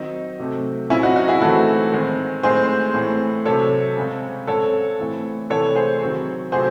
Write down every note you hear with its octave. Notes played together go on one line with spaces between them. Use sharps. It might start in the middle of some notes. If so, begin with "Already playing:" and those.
Already playing: D#3 F#3 C4 D#4
C3 F#3 A3 C4
C#3 F#3 C4 C#4 E4
D#4 F#4
D#4 F#4
E4 G#4
A2 E3 C4 F#4 A4
D#3 G#3 C4
A2 G#3 C4 G#4 C5
A2 E3 C4
C3 F#3 C4 A4 C#5
C#3 G#3 C4
C#3 G#3 C4 A4 C#5
A2 E3 C4
C3 E3 A3 C4 A4 C#5
G#4 C5
D#3 F#3 C4
C3 F#3 A3 C4 G#4 C5